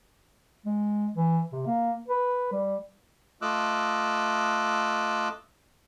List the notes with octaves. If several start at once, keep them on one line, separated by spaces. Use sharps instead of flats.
G#3
E3
C3
A#3
B4
G3
A3 F4 D#5 D6 E6 F#6